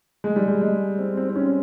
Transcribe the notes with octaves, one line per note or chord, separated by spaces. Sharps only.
G#3
G3
G#3
G#3
C4
C4
C4
C#4